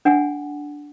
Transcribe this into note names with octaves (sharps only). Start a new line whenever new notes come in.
D4 F#5 G#5